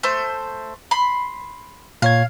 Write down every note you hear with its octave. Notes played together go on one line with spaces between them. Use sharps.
A3 C5
B5 C6
A#2 C#5 F5 G#6